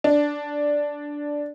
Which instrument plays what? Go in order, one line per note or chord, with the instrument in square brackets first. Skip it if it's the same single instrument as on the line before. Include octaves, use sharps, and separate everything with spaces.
[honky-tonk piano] D4